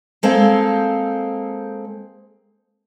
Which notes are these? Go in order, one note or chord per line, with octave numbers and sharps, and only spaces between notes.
G#3 A#3 C4 A4 C5 F5